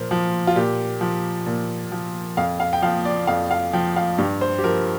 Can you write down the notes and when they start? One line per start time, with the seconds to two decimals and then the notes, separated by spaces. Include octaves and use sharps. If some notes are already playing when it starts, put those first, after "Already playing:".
Already playing: A#2 F3 A#4 C5
0.11 F3
0.47 F4
0.56 A#2 G4
1.01 F3
1.46 A#2
1.92 F3
2.37 F2 F5
2.60 F5
2.73 G5
2.82 F3 F5
3.05 D5
3.27 F2 F5
3.51 F5
3.73 F3 G5
3.96 F5
4.18 G2 G4
4.41 C5
4.58 G4
4.64 F3 A#4